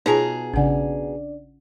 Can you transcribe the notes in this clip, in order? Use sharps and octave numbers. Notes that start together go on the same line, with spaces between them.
B2 D#4 F4 G#4 A5 A#5
A1 C#3 C#4 D4 D5 F#5